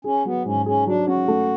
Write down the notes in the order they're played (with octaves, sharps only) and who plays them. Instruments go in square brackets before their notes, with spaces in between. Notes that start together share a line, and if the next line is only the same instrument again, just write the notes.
[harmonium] C#4 [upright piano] G#4
[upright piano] F#3 [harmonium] B3
[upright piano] G#2 [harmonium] C#4
[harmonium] C#4 [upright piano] G#4
[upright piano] F#3 [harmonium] D4
[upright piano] C#4 [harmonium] F#4
[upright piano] A3